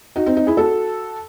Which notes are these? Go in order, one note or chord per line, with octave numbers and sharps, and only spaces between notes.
D#4 F#4
C4 D#4
C4 D#4
E4 G#4
F#4 A4